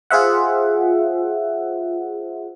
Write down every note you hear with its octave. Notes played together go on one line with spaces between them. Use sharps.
F4 G#4 C5 E5 F#5